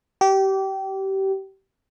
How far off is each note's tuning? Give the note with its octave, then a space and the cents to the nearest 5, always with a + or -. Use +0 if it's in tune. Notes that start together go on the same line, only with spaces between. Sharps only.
G4 -25